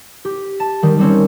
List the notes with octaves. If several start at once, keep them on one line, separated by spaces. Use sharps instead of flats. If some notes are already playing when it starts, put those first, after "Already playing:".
G4
A5
D#3 G3
G3 C4 C#4